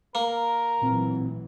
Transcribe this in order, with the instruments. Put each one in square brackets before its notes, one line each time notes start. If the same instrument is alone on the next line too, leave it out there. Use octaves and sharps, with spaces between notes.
[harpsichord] A#3 [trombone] A#4
[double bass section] A1 E3 F#3 [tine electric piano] A#2 C4